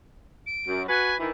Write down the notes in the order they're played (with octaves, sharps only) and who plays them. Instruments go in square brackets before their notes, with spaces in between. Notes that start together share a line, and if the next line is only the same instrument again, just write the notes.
[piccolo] D7
[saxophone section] F#2
[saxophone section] F#4 B4 [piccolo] G#5
[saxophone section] D#3 E3